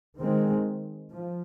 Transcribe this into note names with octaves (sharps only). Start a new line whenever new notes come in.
D#3 G#3 C4
F3